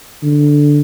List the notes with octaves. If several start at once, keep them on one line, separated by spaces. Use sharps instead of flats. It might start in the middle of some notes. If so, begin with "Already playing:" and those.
D3